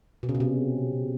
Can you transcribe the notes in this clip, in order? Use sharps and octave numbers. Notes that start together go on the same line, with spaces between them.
B2
C#3
B2
C3